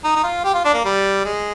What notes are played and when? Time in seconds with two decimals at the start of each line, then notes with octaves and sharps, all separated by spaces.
0.04 D#4
0.16 D#4
0.23 F4
0.45 G4
0.54 F4
0.65 D4
0.74 A#3
0.85 G3
1.25 G#3